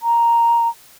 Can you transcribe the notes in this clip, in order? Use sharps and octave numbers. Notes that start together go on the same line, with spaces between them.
A#5